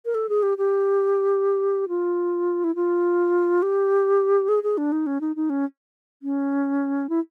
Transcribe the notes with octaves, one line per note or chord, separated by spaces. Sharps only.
A#4
A4
G#4
G4
G4
F4
E4
F4
G4
G#4
G#4
D4
D#4
C#4
D#4
D#4
C#4
C#4
E4